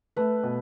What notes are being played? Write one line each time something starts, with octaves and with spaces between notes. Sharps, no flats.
A3 B4
B2